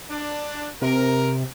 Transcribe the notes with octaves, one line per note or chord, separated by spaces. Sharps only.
D4
C3 A#4